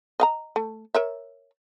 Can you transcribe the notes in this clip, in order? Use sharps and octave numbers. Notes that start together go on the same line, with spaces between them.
D#5 F5 A#5
A3
A#4 C#5 E5